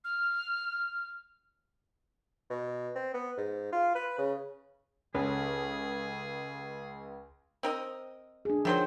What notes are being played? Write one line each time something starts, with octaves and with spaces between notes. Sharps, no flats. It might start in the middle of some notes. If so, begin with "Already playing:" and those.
F6
B2
C4
B3
G#2
F4
B4
C#3
C#2 C#4 G#4 A4 B4
C4 A#4 D#5
D4 G#4
D#3 F3 F#3 C5